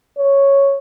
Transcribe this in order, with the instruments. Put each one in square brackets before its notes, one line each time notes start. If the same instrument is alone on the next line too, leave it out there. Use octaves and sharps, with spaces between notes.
[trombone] C#5